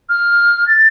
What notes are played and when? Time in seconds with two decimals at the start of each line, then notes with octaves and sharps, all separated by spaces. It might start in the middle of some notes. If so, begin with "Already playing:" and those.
0.09 F6
0.68 A6